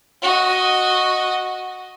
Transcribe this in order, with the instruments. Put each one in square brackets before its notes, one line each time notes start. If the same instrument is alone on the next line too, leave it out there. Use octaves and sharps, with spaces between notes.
[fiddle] F#4 D#5